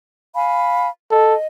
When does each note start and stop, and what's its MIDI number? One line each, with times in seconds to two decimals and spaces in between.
0.35 0.88 77
0.35 0.88 80
0.35 0.88 83
1.11 1.35 69
1.11 1.47 75